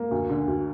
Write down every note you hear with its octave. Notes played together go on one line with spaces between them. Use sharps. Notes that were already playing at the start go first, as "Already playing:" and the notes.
Already playing: A#3
D2
D3
D2